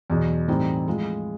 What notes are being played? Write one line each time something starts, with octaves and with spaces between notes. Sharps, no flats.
E2 B2 F#3
A2 E3 G3 C4 D#4
A2 F3 G#3